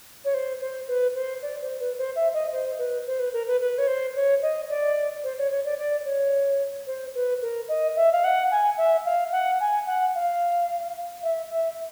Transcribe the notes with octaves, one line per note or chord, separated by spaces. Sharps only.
C#5
C5
C5
B4
C5
D5
C5
B4
C5
E5
D#5
C5
B4
C5
B4
A#4
B4
B4
C#5
C5
C#5
D#5
D5
C5
C#5
C#5
D5
D5
C#5
C5
B4
A#4
D#5
E5
F5
F#5
G#5
E5
F5
F#5
G#5
F#5
F5
E5
E5